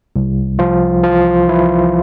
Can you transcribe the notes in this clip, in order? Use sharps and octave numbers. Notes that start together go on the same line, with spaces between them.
C2
C2 F3 F4
E3 F3 F4
E3 E4